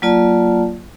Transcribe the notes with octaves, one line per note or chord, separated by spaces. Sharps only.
F#3 A#3 F4 D5 A5